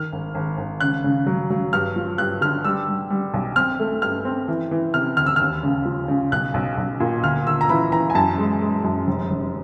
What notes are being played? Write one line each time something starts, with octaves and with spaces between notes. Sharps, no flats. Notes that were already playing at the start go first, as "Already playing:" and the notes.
Already playing: D#3 F6
G#1
G#1
G#1
C#3 F#6
C#3
F#3
F#3
G2 F6
F3
G2 F#6
D3 F6
G3 E6
G3
G3
B1
C4 F6
A3
G2 F6
C4
E3
E3
C3 F6
D2 F6
E6
D#2 F6
C#3
F3
C#3
B1 F#6
B1
B1
A#2
D2 F6
D2 E6
A#5
E3 B5
E3 A#5
G#5
F#2 A5
G#3
G#3
F#2
F1
F1